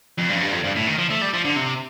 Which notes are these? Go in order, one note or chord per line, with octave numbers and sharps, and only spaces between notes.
F2
G2
F2
G2
F2
G2
A2
D#3
F3
A3
G3
F3
D3
C3